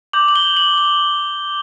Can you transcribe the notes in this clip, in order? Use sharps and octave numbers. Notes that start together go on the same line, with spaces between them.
D6 G6 F#7
F#7
G7
F#7
F#7